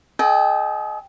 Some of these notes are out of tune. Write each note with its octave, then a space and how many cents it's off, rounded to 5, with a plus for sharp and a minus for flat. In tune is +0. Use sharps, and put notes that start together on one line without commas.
G#4 +45 D#5 -10 G5 +0